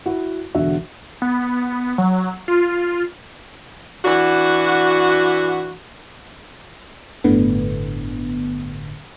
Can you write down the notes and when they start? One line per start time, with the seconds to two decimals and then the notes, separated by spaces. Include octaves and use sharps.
0.06 E4 F#4 F#5
0.54 E1 D3 F#4 E5
1.22 B3
1.98 F#3
2.48 F4
4.04 E3 D4 F#4
7.24 G1 A2 D3 B3